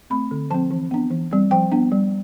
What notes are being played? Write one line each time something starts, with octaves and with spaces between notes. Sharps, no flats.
A3 C4 B5
D3
F3 C4 A5
E3
B3 D4
E3
G3 C4
F3 G5
B3 D4
G3